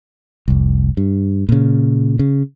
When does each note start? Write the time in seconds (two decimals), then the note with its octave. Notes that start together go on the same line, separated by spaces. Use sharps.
0.48 F1 C2
0.97 G2
1.49 A#2 C#3
2.19 C#3